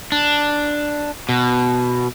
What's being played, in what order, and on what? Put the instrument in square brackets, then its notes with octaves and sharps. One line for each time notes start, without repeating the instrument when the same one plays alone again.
[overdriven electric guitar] D4
B2